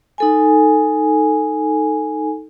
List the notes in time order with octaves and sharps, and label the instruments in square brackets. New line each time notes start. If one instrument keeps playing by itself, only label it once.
[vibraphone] D#4 A4 G#5